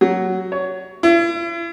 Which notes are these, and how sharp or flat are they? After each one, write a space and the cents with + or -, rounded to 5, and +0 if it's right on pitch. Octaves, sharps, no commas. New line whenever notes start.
F#3 +10
C#5 +15
E4 +40